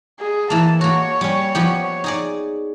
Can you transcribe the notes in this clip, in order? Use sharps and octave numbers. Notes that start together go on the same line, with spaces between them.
G#4
E3 A#3 A5
A#3 F#4 C#5
G3 C#4
F3 B3 G4
D#4 G#4 D5